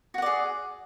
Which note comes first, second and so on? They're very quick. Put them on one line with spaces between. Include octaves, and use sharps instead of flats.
F#4 F#5 D5 G#4